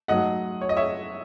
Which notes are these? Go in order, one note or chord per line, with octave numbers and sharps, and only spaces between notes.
G#2 F#3 A3 D#5 F#5
C#5
D#5
C#5 E5